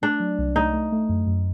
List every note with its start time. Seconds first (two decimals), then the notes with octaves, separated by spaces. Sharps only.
0.02 A3 D4
0.20 F#3
0.38 C2
0.56 A3 D#4
0.73 A3
0.92 A3
1.09 F#2
1.27 F#2